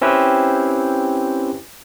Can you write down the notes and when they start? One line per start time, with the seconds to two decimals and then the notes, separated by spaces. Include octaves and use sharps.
0.01 C4 C#4 E4 G4 B4